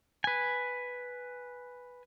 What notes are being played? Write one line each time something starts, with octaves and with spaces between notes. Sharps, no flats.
B4 G#5